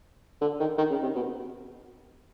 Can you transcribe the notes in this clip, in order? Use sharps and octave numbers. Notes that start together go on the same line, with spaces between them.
D3
D#3
D#3
C#3
C3
B2